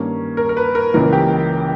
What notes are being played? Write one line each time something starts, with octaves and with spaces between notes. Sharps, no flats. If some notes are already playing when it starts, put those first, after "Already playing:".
Already playing: G2 D#3 A#3 C#4
A#4
A#4
B4
A#4
C#2 C#3 E3 A#3 A#4
G4